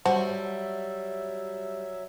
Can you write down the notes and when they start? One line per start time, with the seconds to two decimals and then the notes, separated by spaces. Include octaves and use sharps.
0.06 F#3 G3 F#4 C5 E5 F#5 A5